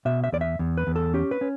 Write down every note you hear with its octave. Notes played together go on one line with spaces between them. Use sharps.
B2 E5
E5
E2 D5
E5
E2
B4
E2
A4
C#4 G4
B4
C#4